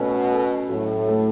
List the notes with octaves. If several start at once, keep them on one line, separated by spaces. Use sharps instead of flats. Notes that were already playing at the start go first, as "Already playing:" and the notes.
Already playing: B2 A3 C#4 A4
A4
A2 F#3
A3